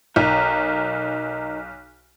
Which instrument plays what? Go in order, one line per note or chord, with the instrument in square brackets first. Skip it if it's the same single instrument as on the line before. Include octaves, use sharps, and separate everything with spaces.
[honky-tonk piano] B1 [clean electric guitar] D#4 A#4